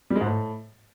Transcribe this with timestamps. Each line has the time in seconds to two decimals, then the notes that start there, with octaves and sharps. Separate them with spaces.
0.10 G3
0.16 G#3
0.21 G#2
0.26 A2